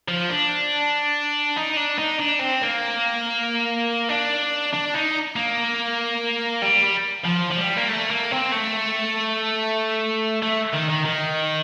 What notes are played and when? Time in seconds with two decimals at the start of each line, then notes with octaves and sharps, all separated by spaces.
0.08 F3
0.30 D4
1.56 D#4
1.77 D4
1.99 D#4
2.20 D4
2.40 C4
2.62 A#3
4.09 D4
4.73 D4
4.94 D#4
5.36 A#3
6.62 G3
7.25 F3
7.51 F3
7.58 G3
7.77 A#3
7.89 A3
8.11 A#3
8.32 C4
8.52 A3
10.43 A3
10.74 D#3
10.90 D#3
11.05 D#3